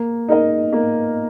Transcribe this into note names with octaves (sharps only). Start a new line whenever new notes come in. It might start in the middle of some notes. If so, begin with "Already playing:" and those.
Already playing: A#3
D#4 A#4 D#5
A#3